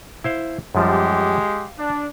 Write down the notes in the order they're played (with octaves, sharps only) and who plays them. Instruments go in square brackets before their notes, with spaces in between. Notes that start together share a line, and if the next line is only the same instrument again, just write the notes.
[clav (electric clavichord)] E4 C5 F5
[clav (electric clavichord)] F#2 F3 G3 [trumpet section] G#3 G4
[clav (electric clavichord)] F5
[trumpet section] D4